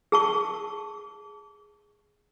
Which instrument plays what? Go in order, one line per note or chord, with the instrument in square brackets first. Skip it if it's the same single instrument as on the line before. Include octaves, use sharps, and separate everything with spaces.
[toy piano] G#4 A5 C#6